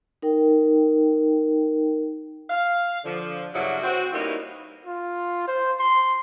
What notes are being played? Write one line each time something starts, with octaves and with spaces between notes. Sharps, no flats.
D#4 A#4 G5
F5
D3 F3
G2 C#3 F#3 E4 F#4
C4 F#4
G3 A#3 B3 C#4 D#4 E4
F4
C5
C6